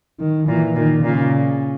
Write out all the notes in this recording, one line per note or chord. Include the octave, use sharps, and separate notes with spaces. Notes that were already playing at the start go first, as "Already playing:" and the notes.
D#3
A#2 E3
A#2 D#3
A#2 C#3